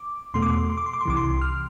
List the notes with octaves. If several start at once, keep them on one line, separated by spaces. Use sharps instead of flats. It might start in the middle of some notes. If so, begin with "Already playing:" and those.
Already playing: D6
E2 B2 A3 C6
D6
C6
C6
D6
C6
D6
C6
C2 C3 E3 D6
C6
F6